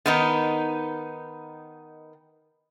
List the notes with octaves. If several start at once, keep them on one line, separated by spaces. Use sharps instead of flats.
D#3 B3 D#4